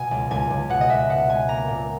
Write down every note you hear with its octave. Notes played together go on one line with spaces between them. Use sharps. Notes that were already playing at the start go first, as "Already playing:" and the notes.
Already playing: B2 G#5
C#2
C#2 G#5
C#2
B2 F#5
D#5
C#2 E5
B2 F#5
G#3 G#5
A#3 A#5
A#2